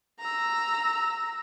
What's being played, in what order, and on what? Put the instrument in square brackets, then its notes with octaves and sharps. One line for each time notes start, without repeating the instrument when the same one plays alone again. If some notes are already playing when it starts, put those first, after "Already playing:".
[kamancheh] A#5 E6